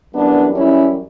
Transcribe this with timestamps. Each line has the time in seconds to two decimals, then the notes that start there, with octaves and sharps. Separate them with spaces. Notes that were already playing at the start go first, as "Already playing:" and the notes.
0.12 F#2 E3 G3 B3 D4
0.55 C#4 E4